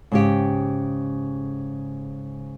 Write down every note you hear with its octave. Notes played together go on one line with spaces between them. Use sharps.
G#2 C#3 G4